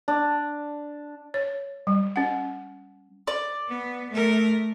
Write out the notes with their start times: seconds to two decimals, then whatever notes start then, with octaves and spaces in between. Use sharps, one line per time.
0.08 D4
1.34 C#5
1.87 G3
2.16 C#4 F#5
3.27 D5
3.69 B3
4.10 A3 A#4